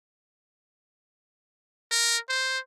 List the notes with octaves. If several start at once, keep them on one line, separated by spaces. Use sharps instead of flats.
A#4
C5